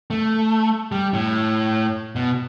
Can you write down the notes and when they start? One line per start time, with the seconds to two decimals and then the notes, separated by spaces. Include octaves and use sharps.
0.10 A3
0.92 G3
1.13 A2
2.15 B2